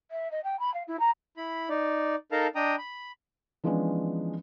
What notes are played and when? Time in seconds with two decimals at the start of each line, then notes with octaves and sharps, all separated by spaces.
0.11 E5
0.31 D#5
0.44 G5
0.60 B5
0.74 F5
0.88 E4
1.00 A#5
1.37 E4 B5
1.69 D#4 D5
2.32 D#4 A4 A#4 F5 A5 A#5
2.55 D4 D#5 G5 A#5 D#6
2.78 B5
3.64 E3 F3 G#3 B3 C#4 D4